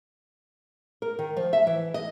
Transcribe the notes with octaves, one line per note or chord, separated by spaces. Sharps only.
A#4
D#3
F3
E5
E3
D#5